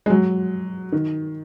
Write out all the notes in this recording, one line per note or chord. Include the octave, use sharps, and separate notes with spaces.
G#3
F#3
D#3